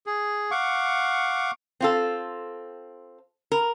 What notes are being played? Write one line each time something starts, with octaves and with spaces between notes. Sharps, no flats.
G#4
F5 F#5 C#6 D6
C4 F4 A4
A#4